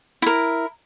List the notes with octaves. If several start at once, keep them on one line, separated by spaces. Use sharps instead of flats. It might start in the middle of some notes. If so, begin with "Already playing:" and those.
E4 A#4